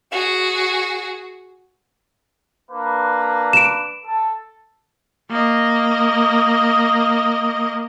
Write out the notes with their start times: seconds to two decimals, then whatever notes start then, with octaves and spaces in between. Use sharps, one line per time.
0.12 F#4 G#4
2.71 A#3 D4 B4
3.53 D7 E7
4.06 A4
5.30 A#3 D#5